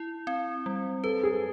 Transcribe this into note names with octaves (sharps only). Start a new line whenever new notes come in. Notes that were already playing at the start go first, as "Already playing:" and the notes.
Already playing: E4
C4
G3
A4 B4
G#4